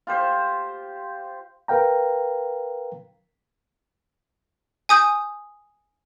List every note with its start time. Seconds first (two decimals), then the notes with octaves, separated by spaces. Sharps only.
0.07 F4 G4 C5
1.68 A#4 B4 F5 G5 A#5
4.89 G#5 D#6 G6